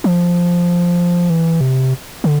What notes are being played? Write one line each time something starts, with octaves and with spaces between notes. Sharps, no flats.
F3
E3
C3
D3